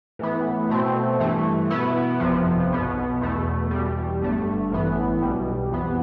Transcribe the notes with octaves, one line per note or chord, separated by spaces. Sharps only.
A2 E3 B3
B2 A3 C4
G2 E3 A3
B2 B3 E4
G1 F2 C3 F3 B3
B1 B2 B3
E2 B2 A3
E2 B2 G3
G1 G2 D3 A3
A1 A2 E3 B3
B1 B2 G3
F2 E3 B3